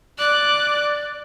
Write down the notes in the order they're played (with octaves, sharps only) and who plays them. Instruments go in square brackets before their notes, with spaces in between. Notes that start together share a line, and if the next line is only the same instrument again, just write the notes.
[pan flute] D5 [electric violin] D6 F#6